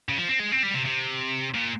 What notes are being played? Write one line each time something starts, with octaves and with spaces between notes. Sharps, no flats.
C#3
F3
C4
G#3
C4
G3
C3
C3
A#2